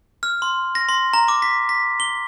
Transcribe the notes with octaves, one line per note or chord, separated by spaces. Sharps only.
F6
C6
A#6
C6
A#5
D6
B6
B6
G7